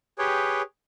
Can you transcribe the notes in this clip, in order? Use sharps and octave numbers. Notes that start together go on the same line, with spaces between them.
G4 G#4 B4 C#5 G5